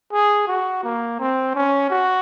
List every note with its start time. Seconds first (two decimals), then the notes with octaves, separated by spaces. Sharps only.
0.13 G#4
0.48 F#4
0.83 A#3
1.20 C4
1.55 C#4
1.90 F#4